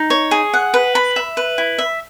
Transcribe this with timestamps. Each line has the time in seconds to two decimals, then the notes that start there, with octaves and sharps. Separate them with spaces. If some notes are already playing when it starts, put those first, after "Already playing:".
Already playing: D#4
0.10 C#5
0.31 G#4
0.54 F#5
0.74 B4
0.95 B5
1.16 E5
1.37 B4
1.58 E4
1.79 E5